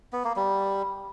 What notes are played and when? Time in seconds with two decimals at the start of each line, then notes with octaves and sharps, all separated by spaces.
0.13 B3
0.25 A#3
0.36 G3